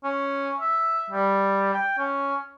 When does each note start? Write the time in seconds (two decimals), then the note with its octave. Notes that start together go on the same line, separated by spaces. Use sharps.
0.04 C#4
0.60 E5
1.10 G3
1.74 G5
1.98 C#4